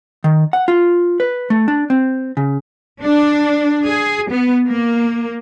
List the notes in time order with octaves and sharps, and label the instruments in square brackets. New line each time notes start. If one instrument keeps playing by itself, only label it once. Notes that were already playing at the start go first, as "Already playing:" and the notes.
[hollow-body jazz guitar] D#3
F#5
F4
B4
A3
D4
C4
C#3
[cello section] D4
G#4
B3
A#3